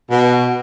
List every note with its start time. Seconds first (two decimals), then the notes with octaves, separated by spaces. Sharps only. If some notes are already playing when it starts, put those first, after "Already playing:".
0.10 B2